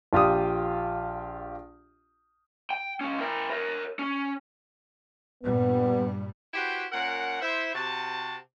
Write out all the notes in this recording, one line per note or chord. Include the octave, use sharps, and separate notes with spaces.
A#1 F4 G4 D#6
G5
C#2 C#4
E4 A#4
A#4 C#5
C#4
G2 A#2 G3 B3
E4 F#4 G4 B4 C5 G5
A#2 C#4 A#4 F#5
E4 C5 E5
C3 F#4 A5